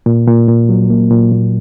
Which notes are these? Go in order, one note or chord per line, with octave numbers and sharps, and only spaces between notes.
A#2
A#2
A#2
F#3
A#3
A#2
A#2